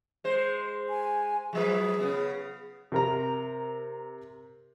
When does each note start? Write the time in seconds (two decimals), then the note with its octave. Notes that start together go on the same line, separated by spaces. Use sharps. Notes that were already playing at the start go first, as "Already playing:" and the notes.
0.24 G#3 C5
0.89 G#5
1.53 F3 F#3 G#4 B4
2.00 C#3 B3
2.92 C3 A#4 A#5